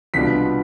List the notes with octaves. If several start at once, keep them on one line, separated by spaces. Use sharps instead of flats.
C2 B2 B3 D4 F4 B6